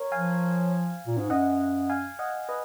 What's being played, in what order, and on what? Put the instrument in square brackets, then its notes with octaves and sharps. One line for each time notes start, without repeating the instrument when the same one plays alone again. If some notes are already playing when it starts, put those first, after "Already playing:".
Already playing: [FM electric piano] A#4 C#5
[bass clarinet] F3 [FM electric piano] F5 G#5
[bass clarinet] A#2
G#2
[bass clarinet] F#2 [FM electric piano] D#5 F#5
[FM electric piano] F5 G#5
D#5 F#5
B4 D#5